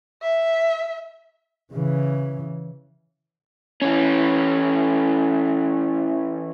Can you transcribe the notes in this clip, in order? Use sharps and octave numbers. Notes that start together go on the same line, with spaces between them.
E5
C#3 E3
E3 C#4